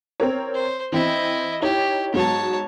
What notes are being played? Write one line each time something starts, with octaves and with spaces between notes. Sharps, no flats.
C4 A#4 C#5
C5
E3 C4 E4 D#5
D#4 E4 G4 C#5
G#2 F#3 B3 C#5 A5